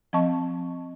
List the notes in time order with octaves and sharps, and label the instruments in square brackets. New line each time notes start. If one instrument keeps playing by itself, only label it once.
[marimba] F3 C4 D#5 A5 C#6